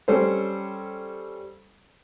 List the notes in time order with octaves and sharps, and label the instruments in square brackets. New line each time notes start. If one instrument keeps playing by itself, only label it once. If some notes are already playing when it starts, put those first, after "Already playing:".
[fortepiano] G3 C#4 A4 C5